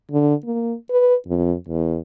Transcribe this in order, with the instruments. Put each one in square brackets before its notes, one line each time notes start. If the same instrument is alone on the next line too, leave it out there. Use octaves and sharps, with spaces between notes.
[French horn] D3
A#3
B4
F2
E2